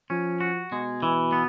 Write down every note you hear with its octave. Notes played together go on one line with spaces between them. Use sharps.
F3 C#4
F#4
B2 G#3
E3
B3